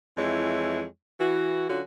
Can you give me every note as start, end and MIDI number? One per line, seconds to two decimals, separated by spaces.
0.17 0.84 41
0.17 0.84 52
0.17 0.84 56
0.17 0.84 64
0.17 0.84 73
1.19 1.69 52
1.19 1.69 66
1.69 1.81 50
1.69 1.81 54
1.69 1.81 61
1.69 1.81 65
1.69 1.81 66